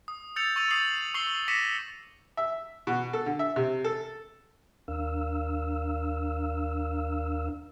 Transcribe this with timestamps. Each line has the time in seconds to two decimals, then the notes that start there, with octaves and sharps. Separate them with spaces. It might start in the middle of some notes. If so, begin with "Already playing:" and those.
0.08 D#6
0.36 E6 G6 A6 C#7 F7
0.56 C#6 E6 A6 D#7 F7
0.70 D#6 A6 C7 F7 F#7
1.14 C#6 E6 C7 F#7 G7
1.48 D6 A#6 B6 C#7 D#7 E7
2.37 E5
2.87 B2
3.13 A4
3.26 D3
3.39 E5
3.56 C3
3.84 A4
4.88 D#2 D4 A#4 F5 E6